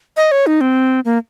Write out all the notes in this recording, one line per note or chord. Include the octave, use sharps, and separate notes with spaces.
D#5
C#5
D#4
C4
A#3